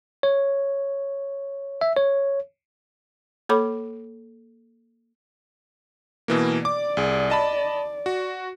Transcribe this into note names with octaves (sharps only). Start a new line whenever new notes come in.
C#5
E5
C#5
A#3 A4 C#5 B5 D6
B2 E3 A#3
D5 D6
C2 G#4
D#5 A5 B5
F#4